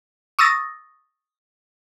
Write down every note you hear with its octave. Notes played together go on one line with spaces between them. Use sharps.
C#6 D#6 E6 A6 A#6